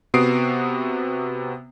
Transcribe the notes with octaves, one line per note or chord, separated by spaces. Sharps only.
C3 B3 F#4 D#6 C7 D7